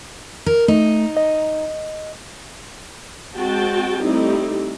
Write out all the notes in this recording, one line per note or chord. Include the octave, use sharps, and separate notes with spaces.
A#4
A3 D#4
D#5
G#3 C4 F#4 G5 A5
G3 A3 C4 D#4 E4 G4